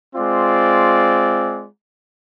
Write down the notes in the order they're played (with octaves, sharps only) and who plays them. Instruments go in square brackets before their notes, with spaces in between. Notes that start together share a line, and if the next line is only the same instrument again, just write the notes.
[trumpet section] G#3 C4 F4 D5